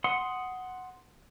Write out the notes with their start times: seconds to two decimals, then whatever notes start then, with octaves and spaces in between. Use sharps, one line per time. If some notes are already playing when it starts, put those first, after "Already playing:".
0.04 F#5 C6 D#6